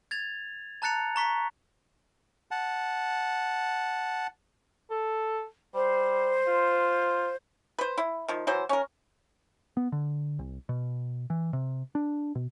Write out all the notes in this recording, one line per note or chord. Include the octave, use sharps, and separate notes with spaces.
G#6 A6 F7
A5 A#5 F#6 A6 C#7 F7
A#5 C#6 B6
F#5 A5
A4
G3 C5
F4
B4 C5
E4
D#3 F3
E3 F#3 C5
C#4 A#4
B3
D3
C2
B2
E3
C3
D4
B2